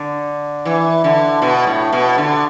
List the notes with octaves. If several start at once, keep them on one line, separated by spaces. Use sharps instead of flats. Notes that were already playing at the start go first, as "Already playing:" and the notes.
Already playing: D3
E3
D3
B2
A2
B2
D3